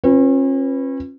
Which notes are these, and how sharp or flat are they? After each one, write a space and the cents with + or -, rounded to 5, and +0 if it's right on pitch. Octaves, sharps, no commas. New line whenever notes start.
C#4 -40 F4 +5 B4 +0